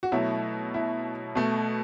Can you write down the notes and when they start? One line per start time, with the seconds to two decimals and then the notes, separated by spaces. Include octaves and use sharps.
0.03 F#4
0.12 B2 F#3 A3 E4
0.74 E4
1.35 B2 A3